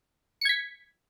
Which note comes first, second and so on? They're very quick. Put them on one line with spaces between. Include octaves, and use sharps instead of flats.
C#7 G#6 B6